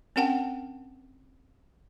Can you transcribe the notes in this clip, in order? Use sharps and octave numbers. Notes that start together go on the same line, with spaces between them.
C4 C#4 A#4 F#5 G5 A5